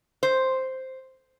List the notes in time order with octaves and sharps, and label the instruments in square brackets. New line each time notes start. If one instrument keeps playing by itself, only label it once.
[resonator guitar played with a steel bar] C5